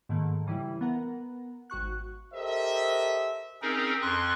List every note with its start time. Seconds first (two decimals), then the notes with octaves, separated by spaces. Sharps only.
0.09 G#2 D#3 A3 A#3
0.46 C#3 E3 G3 E4
0.81 B3 A#4 F#5 A#5
1.70 G#1 F#4 C#6 F#6
2.34 G4 A4 A#4 C5 D#5 E5
3.62 C4 C#4 D#4 G#4 A#4
4.02 F2 C6 C#6 F#6